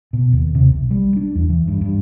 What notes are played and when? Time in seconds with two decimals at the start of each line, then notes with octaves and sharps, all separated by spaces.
0.13 B2
0.32 D#2
0.55 C3
0.69 B1
0.91 G3
1.16 D4
1.35 E2
1.49 E3
1.68 G2
1.81 G2